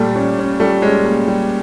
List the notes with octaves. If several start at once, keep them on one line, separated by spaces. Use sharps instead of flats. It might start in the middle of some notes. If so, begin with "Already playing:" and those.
Already playing: A#2 G3 A3
C#4
C#4
G3 A3
G#3 C#4
A#3
G3